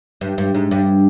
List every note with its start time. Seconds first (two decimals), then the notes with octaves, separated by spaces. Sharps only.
0.21 G2
0.38 G2
0.55 G#2
0.71 G2